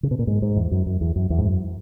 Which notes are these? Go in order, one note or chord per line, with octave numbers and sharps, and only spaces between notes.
C#3
B2
A#2
G#2
G#2
E2
F#2
F#2
E2
F#2
E2
G#2
F#2